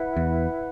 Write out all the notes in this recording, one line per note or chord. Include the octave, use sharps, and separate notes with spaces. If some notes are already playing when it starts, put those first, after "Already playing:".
Already playing: E4 B4 F#5
E2